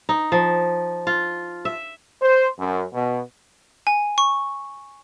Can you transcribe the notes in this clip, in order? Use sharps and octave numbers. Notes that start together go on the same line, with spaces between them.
D#4
F3
F4
E5
C5
F#2
B2
G#5
C#6